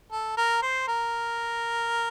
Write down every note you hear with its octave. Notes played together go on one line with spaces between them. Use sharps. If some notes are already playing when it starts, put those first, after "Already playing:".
A4
A#4
C5
A#4